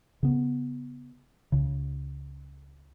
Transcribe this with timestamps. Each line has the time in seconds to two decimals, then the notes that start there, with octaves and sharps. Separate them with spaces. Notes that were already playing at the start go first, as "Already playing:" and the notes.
0.23 C#3 B3
1.52 C#2 C#3